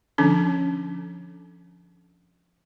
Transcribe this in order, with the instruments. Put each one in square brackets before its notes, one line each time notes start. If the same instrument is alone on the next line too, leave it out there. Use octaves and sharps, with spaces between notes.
[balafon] D3 F3 C#4 D4